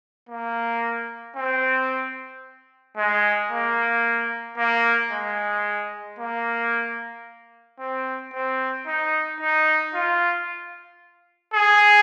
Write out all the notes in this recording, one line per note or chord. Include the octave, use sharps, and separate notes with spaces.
A#3
C4
G#3
A#3
A#3
G#3
A#3
C4
C4
D#4
D#4
F4
G#4